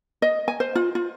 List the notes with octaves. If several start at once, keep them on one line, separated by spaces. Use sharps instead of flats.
D#5
G#5
C5
F4
F4